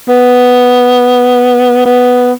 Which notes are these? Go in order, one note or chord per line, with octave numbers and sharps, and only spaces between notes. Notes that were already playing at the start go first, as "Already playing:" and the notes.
B3
B3